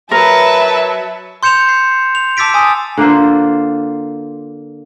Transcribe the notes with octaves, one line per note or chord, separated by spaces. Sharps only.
F#3 A#4 B4 E5 A5
C6 G6 C#7 E7 F7
C7
F7
A5 D6 E6 A6 B6 D7
G#5 D#6 E6
D3 A#3 F4 C5